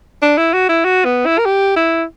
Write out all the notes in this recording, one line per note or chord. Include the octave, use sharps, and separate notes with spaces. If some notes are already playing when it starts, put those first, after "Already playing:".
D4
E4
F#4
E4
F#4
B3
E4
A#4
G4
E4